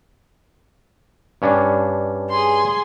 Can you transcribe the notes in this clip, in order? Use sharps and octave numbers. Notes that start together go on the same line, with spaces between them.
G2 C#4 D4
G#4 C6